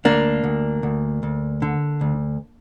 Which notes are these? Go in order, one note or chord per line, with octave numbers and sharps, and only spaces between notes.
D2 A#3 D4
D2
D2
D2
D3
D2